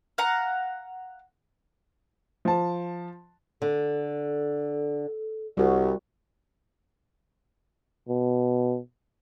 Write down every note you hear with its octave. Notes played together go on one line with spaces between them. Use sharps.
F5 F#5 A#5
F3 A5
D3 A4
C2 G3 F#4
B2